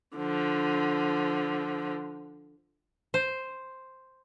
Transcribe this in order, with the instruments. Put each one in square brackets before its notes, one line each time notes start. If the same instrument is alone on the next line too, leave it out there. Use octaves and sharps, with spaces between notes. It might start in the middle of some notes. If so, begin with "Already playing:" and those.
[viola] D3 F3
[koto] C5